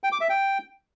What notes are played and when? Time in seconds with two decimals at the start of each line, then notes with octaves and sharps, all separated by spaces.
0.04 G5
0.12 D6
0.21 E5
0.29 G5